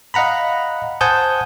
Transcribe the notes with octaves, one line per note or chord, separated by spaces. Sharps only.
D#5 F5 F#5 A#5 B5
C5 F#5 G#5 A5 D#6 G6